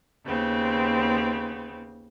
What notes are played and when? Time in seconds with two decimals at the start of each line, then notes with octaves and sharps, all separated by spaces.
0.25 D#2 C#3 B3 C4